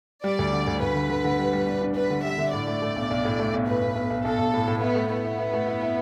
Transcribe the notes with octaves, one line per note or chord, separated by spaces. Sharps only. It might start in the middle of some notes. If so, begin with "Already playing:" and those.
G3 D5
D2
D3
D2
D2 B4
D3
D3
D3
G3
G3
D4
D4
D4 B4
D3
G3 E5
D3
A2 D5
A3
A3
B1
B1
A2
A3
B1
A2 B4
B1
B1
B1
B1 A4
B1
A2
A2
B3 E4
A3
B3 E4
E4
E4
A3
E4
E4